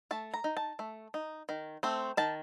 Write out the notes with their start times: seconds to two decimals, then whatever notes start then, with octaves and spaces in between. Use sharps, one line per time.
0.11 A3 A5
0.34 A#5
0.44 D#4
0.57 A5
0.79 A3
1.14 D#4
1.49 D#3
1.83 A3 C4
2.17 D#3 A5